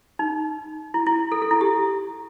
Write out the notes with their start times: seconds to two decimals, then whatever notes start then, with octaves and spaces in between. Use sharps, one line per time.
0.19 D#4
0.94 E4
1.06 E4
1.32 A4
1.42 A4
1.51 E4
1.61 G4